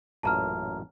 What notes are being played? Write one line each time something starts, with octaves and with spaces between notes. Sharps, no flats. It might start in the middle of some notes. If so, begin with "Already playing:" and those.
A1 F#2 A#2 A5 A#5 F6